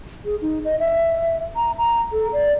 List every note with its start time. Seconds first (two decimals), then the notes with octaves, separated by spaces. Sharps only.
0.25 G#4
0.41 D#4
0.65 D#5
0.80 E5
1.56 A#5
1.78 A#5
2.13 A4
2.33 D5